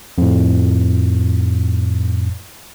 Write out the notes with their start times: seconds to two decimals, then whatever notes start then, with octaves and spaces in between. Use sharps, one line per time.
0.18 F2 A2